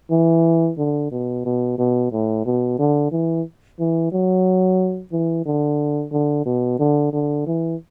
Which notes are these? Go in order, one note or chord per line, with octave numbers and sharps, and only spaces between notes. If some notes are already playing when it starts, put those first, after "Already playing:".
E3
D3
B2
B2
B2
A2
B2
D3
E3
E3
F#3
E3
D3
D3
B2
D3
D3
E3